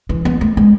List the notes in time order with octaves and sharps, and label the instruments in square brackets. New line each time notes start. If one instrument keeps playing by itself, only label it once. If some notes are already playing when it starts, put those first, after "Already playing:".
[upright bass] E3
B3
A3
G#3